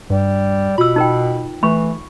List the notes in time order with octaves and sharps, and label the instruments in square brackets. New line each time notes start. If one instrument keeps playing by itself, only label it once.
[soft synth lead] G2 [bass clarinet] G3
[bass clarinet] B2 [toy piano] F4 E6 [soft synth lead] B5
[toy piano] D#4 A#4 G5
[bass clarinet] E3 [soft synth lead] A3 [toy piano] B5 C#6